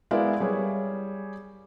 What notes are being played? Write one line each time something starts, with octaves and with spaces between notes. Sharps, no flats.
G#3 B3 E4 A#4 D5 F5
G3 G#4 C#5